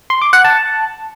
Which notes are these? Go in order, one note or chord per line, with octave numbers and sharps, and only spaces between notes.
C6
D6
F#5
A5